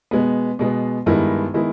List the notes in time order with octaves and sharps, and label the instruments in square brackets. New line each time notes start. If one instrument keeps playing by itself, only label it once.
[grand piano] B2 G#3 B3
B2 G#3 B3
G2 D#3 G#3 B3 E4
D#3 G#3 B3 E4